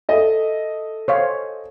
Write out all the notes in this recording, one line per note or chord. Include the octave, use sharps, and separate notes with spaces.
A4 D#5 E5
C5 C#5 F5